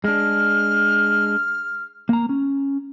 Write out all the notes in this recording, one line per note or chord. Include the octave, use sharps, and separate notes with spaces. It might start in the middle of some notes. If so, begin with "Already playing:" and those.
G#3 D4 F6
A#3 A#5
C#4